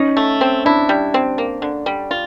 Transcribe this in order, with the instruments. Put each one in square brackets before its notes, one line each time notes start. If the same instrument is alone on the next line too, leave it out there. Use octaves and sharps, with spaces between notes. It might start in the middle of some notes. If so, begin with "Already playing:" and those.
Already playing: [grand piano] C#4 [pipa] D#4
[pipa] A3
C4
[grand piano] D4 [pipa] E4
[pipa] G3
C4
A#3
D3
G3
F4